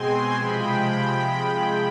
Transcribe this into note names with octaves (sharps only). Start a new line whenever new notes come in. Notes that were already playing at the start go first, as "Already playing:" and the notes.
Already playing: B2 G#3 C4 G#5 C6
C3 F3 G#3 G5 B5